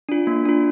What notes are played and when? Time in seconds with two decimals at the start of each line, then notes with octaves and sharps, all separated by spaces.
0.09 D4 F4
0.27 A#3
0.45 D4 F4